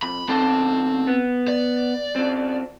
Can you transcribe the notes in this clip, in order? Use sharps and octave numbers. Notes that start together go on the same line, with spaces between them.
F2 B5
B1 D#3 C4 A4
B3
D5
F#2 C4